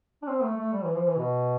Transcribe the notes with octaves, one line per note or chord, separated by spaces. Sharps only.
D4
C4
A3
A3
G3
E3
F3
E3
B2